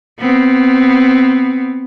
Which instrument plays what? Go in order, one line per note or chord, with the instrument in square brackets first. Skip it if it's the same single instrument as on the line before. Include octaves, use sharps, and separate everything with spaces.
[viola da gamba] B3 C4